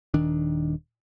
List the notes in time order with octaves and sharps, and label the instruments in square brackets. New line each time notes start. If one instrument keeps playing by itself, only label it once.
[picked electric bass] D#1 D#3 D4